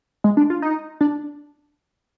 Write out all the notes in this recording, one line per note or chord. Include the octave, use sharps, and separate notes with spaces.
G#3
D4
F4
D#4
D4